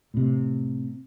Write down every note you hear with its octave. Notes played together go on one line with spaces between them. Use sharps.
A2 C3